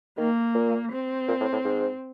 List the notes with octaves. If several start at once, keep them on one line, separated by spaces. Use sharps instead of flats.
D#3 A#3
A#2
C4
A#2
A2
A2
G#2